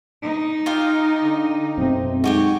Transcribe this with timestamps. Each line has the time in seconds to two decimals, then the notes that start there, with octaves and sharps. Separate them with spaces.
0.25 D#4
0.66 F4 G4 F5
1.23 D3
1.78 F#2 B2 A3 C4
2.24 G#3 D#4 F#4 G4 C#5